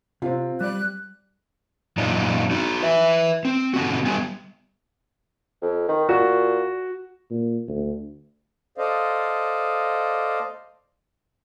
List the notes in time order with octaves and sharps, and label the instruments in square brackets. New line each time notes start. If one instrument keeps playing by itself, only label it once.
[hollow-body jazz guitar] C3 [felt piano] C4 F4
[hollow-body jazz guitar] G3 D5 [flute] F#6
[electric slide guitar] F#2 A#2 D4 D#4 F4
D#4 F#4
B4 E5
C4
D3 B3 F#4
G3 B3 G#5
[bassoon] F2
D#3
[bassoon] A#2 [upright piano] F#4
[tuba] A#2
D2
[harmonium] A4 C5 D5 D#5 F5